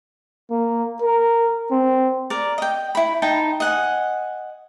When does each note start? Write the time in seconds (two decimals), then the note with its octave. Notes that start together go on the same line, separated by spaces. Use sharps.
0.50 A#3
1.02 A#4
1.71 C4
2.30 A#4 D5
2.58 D#5 G5
2.95 E4 B5
3.22 D#4 G5 A5
3.60 D#5 F#5 G#5